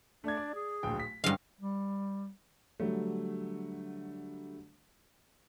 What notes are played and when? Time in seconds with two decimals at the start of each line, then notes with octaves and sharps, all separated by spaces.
0.24 A3 D4 G#6
0.37 D5
0.55 G#4
0.83 D1 A#1 G5
1.00 B6
1.24 G2 D3 G#3 C#4 E4 F5
1.61 G3
2.80 D3 F#3 G3 A3